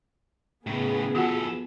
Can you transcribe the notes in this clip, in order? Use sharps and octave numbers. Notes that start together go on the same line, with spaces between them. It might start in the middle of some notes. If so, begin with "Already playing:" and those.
A2 C#3 B3 G#4
E2 F4 F#4 A4 F#5